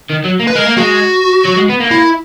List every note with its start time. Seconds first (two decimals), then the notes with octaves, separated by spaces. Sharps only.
0.10 D#3
0.24 F#3
0.39 A#3
0.47 B4
0.55 G#3 A#4
0.66 A#3
0.78 G#3 F#4
1.46 F#3
1.57 G#3
1.69 B3
1.80 A#3
1.91 E4